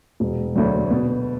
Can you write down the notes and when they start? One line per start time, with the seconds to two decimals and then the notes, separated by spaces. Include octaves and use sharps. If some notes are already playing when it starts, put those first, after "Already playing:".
0.20 E1
0.55 D2 D3 F#3
0.91 B2